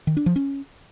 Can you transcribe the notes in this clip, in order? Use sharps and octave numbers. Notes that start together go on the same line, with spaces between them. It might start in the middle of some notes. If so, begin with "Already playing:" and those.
D#3
D4
F3
C#4